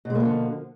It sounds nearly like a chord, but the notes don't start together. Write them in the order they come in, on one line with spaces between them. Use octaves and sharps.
B2 G#3 A#3 F3 D3